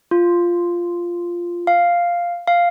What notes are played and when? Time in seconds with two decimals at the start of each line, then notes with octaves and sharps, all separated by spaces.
0.11 F4
1.67 F5
2.48 F5